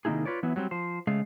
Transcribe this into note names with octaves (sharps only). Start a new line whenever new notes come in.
C3 D#3 A#3 D#4 E4 G#4
F4 B4 C#5 D5
E3 F#3 B3 E4
F#3 G3 B3 C4
F3 C5
C#3 G#3 A3 G#4 F5